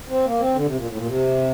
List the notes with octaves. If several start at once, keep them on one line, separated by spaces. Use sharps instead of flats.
C4
A#3
C4
D3
C3
A#2
A2
A#2
C3